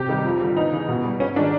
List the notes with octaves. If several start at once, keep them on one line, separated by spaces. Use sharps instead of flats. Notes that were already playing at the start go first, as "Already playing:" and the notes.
Already playing: C3 G4
D#3 G3
F2
D3 G3
E2 D#4
C#3 E3
B2
G3
G#2 C#4
D#3 G#3 D4